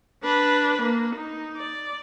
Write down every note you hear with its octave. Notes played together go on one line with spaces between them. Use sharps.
D4 B4
A#3
D#4
D5